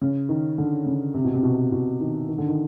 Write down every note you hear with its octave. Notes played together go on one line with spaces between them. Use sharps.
C#3
D#3
D3
C#3
C3
B2
C3
B2
B2
D#3
D#3
D3
D#3